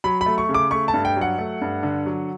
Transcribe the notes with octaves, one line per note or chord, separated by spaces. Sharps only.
F#3 B5
B5
A3
C#6
C#3
D6
A3 C#6
A5
G2
G5
F#3
F#5
A3
G2
D3
F#3